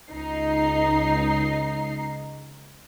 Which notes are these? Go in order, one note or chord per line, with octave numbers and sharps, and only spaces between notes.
C#2 D#4 C7